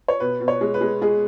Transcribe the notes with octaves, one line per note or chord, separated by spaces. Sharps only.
C#5
B2 B4
B2
C#5
G#3
B4
G#3
G#3 G#4